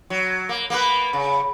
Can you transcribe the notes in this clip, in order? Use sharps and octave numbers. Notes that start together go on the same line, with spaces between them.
F#3
A#3
A#3 B3 B4
C#3